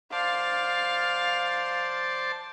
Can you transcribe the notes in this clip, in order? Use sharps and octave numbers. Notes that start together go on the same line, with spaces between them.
C5 D5 F5 A5